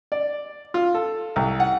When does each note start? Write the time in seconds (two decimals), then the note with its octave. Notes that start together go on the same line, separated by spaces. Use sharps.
0.12 D5
0.74 F4
0.95 A4
1.36 C2
1.60 F#5